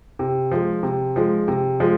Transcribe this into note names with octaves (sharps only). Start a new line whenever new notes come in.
C3
F3 G#3
C3
F3 G#3
C3
F3 G#3